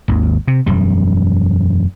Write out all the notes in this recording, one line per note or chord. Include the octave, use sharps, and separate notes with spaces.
G#1 D#2
C3
E1 F#2 G3